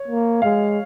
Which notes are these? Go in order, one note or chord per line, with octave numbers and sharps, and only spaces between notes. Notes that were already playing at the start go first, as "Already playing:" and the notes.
Already playing: C#5
A#3
G#3 F5